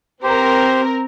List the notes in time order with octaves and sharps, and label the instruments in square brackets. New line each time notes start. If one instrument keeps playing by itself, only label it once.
[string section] C4 A#4 [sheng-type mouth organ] G4 C5